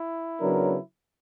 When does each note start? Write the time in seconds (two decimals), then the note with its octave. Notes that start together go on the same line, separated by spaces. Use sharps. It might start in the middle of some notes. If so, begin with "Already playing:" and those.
Already playing: E4
0.40 C#3 F#3 B3 D4 A#4